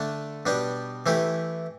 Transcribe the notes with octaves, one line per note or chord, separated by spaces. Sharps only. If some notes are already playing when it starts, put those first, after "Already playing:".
Already playing: D3 A3 D4 A4
B2 G3 D4 G4
E3 A3 E4 G4